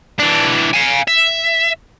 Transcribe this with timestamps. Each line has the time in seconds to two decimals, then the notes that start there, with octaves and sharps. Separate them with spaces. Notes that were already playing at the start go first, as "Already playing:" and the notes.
0.19 E3 D4
0.74 F5 G#5
1.08 E5